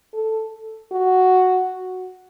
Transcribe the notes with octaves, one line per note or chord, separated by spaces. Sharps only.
A4
F#4